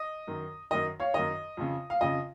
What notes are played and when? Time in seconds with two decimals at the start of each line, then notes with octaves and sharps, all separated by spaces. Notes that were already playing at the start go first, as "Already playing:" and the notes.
Already playing: D#5
0.27 F#2 D#3
0.71 F#2 D#3 D#5
1.00 C#5 F5
1.14 F#2 D#3 D#5
1.57 F2 C#3
1.90 F5
2.01 F2 C#3 D#5